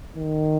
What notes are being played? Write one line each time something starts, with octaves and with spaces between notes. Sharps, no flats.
D#3